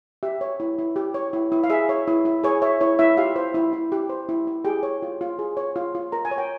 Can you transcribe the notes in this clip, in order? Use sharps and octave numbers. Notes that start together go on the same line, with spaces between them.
G4 E5
C#5
E4
E4
G4
C#5
E4
E4
F5
G#4 E5
C#5
E4
E4
G#4 C#5
C#5 E5
E4 C#5
E4 E5
F4 G4 F5
C5
E4
E4
G4
C5
E4
E4
G4 G#4 G5
C#5
F4
F4
G#4
C#5
F4
F4
A#4 A#5
G#5
C#5
G5